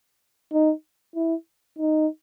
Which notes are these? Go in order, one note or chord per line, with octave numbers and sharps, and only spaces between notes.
D#4
E4
D#4